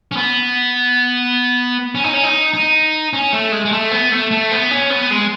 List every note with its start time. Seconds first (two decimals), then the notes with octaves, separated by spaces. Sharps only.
0.12 C#4
0.17 B3
1.95 C#4
2.04 D#4
2.13 C#4
2.24 D#4
2.54 D#4
3.13 C#4
3.33 A3
3.52 G#3
3.65 G#3
3.72 A3
3.91 B3
4.12 A3
4.31 A3
4.51 B3
4.71 C#4
4.90 B3
5.11 G#3